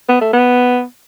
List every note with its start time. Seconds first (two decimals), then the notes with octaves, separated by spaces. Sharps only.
0.09 B3
0.21 A3
0.33 B3